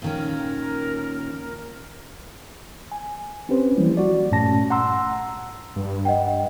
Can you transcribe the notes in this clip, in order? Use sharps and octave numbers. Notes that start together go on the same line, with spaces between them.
A#2 D#3 C#4 A#4
G#5
C4 C#4 G4 B4 C5
E3 F3 G3 A#3 E4
F#4 D5
G2 A#2 A3 C#4 A5 A#6
F#5 A#5 C6 E6
G2
D#5 F#5 G5